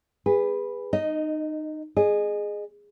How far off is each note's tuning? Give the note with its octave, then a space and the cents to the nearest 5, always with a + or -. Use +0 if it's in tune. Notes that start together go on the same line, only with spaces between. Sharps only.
G#4 -25 B4 +0
D#4 -20 D#5 +0
G#4 +0 D#5 -25